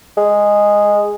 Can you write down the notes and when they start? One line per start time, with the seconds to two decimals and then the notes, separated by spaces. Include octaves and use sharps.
0.17 G#3